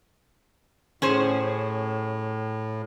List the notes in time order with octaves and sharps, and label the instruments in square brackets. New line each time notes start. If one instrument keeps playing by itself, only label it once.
[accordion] A2 [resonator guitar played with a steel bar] C#4 G#4 C5